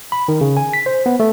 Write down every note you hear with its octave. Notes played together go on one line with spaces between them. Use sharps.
B5
D#3
C#3
G#5
B6
C5
B3
A3